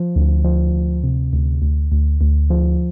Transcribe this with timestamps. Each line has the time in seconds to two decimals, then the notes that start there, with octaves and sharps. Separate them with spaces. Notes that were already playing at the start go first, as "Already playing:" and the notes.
Already playing: F3
0.16 D2
0.44 F3
0.75 D2
1.04 C3
1.33 D2
1.62 D2
1.92 D2
2.21 D2
2.50 F3